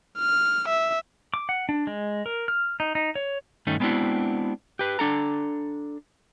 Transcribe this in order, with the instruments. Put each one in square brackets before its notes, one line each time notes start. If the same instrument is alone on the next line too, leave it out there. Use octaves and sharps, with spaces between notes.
[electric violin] F6
E5
[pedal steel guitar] D6
F#5
D4
G#3
A#4
F6
D#4
D#4
C#5
[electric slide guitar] G2 D#3 A3 C#4 D#4
G#3 B3 C4 D4 E4 F#4
G4 B4
D4 A4 A#5